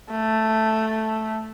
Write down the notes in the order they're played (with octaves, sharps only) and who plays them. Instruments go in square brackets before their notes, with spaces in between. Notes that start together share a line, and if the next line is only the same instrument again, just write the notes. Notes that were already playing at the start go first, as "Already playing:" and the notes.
[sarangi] A3